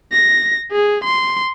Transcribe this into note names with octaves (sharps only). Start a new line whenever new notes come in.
A#6
G#4
C6